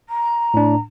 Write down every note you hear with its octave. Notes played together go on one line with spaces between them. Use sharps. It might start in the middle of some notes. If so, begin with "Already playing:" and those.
A#5
A2 D4